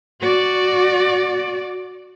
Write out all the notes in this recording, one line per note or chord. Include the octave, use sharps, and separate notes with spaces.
F#4 D5